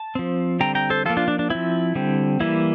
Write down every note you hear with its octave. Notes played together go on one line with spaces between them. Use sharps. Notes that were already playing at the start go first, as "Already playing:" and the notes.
Already playing: A5
F3 C4
D3 G3 C4 G5 A#5
G5 A#5
A4 C5
F3 A#3 F4 A4
D4 F4
D4
D4
F3 C4 E4
D3 G3 C4
E3 G3 A#3 E4